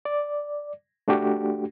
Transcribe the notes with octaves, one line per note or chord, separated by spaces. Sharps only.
D5
A3 D4 F#4 G4